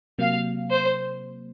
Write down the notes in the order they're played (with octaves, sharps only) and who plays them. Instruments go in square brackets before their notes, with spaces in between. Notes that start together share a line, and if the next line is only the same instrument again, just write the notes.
[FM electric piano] C3 F#3 A#3 [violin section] F5
[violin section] C5